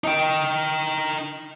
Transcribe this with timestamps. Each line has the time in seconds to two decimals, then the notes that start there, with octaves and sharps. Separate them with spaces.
0.04 D#4 G5